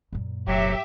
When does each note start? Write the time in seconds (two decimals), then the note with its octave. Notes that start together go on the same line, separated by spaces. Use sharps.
0.12 F#2 A#2
0.48 F1 F#3 G4 E5